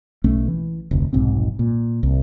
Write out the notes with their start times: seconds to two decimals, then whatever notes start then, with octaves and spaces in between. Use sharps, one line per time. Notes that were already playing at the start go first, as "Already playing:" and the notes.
0.24 B1 A3 C#4
0.48 E3
0.91 F1 D2
1.13 F1 B1 G#2 C4
1.59 A#2
2.03 C2